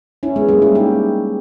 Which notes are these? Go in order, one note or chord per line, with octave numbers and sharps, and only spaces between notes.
C#4 E4
G#3 B3
G3 A#3
C#4 E4
D#4 G4